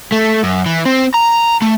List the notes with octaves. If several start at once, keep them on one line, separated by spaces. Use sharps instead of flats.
A3
F#2
E3
C4
A#5
A3